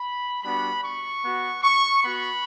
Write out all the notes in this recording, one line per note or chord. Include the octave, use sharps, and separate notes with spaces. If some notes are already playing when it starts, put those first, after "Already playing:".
Already playing: B5
G3 B3 D4 F#4 B5
C#6
B3 F#4
C#6
B3 F#4 B5